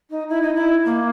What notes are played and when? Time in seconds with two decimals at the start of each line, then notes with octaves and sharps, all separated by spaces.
0.10 D#4
0.29 E4
0.42 D#4
0.54 E4
0.85 A#3